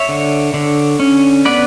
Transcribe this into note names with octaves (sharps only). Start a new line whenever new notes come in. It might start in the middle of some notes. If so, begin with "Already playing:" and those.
Already playing: C#5 E5
D3
D3
C#4
B3 B4 D5